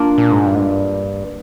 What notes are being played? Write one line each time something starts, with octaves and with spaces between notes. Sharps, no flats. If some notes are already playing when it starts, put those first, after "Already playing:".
Already playing: A#3 D4 F4
A#2
G#2
G2
G#2
G2